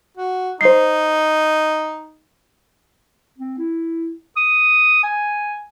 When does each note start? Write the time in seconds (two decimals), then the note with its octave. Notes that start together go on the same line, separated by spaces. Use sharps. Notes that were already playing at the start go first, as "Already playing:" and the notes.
0.17 F#4
0.61 D#4 C5 C7
3.38 C4
3.58 E4
4.37 D#6
5.03 G#5